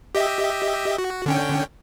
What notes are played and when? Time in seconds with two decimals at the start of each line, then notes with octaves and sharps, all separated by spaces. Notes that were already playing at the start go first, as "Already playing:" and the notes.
0.15 G4 D#5 E5
0.98 F#4
1.26 D3 C#4 G5